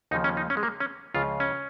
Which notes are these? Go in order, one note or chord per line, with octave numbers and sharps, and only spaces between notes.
D#2 C#3 F3 D#4
C#4
D#4
C#4
G#3
A#3
C#4
C#2 C#3 F3 F4
C#4